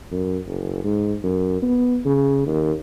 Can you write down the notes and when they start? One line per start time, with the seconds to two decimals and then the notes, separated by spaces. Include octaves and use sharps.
0.12 F#2
0.46 F#1
0.85 G#2
1.24 F#2
1.63 B3
2.06 C#3
2.47 D#2